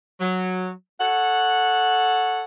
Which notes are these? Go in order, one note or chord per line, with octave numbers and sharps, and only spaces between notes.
F#3
A4 C#5 F#5